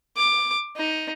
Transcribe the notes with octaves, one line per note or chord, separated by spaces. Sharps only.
D6
D#4